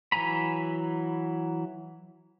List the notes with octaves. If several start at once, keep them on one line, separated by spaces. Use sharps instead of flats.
E3 F#3 G#5 A#5 B5